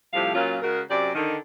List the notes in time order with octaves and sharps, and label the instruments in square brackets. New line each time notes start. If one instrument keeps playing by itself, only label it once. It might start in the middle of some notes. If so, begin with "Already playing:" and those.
[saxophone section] A2 C3 F3 G3 F5
A#2 F#3 A#3 C#4 F4
C#3 G#3 F#4 A#4
F#2 C3 G4 D5
D3 D#3